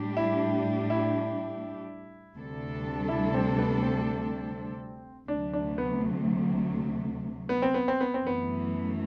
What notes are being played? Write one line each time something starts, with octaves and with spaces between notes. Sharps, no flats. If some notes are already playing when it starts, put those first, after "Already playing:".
Already playing: A2 G3 D4 G4
E4
E4
D2 C3 G3 D4 A4
E4
C4
B3
C4
D2 C3 F#3 A3 D4
D4
B3
B3
C4
B3
C4
B3
C4
F#2 E3 A3 B3